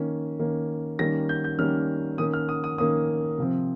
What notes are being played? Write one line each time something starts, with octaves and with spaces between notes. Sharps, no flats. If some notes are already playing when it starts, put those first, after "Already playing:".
Already playing: D#3 A#3 C#4
D#3 A#3 C#4
D#3 G3 A#3 C#4 A#6
G6
G6
D#3 G3 A#3 C#4 F6
D#3 A#3 C#4 D#6
F6
D#6
D#6
D#3 A#3 C#4 D#6
C3 F3 C4